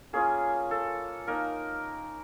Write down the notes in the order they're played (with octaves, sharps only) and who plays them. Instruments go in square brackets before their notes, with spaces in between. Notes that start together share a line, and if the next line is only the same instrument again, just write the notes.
[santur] A#3 C#4 F4 G#4
A4
A#3 D#4 A#4